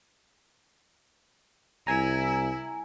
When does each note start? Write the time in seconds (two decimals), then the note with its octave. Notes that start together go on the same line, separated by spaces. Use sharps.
1.87 C2 E4 G#5 A#5